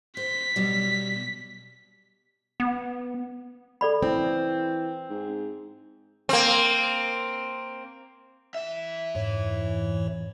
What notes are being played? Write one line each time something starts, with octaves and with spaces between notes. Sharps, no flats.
C5 B6
B2 F#3 G3
B3
A4 D5 B5
E3 C4
G#2
A#3 C4
E3 E5
F2 G#2 C#5